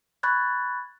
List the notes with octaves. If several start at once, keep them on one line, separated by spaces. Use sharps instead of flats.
B5 C#6 F#6 G#6 A6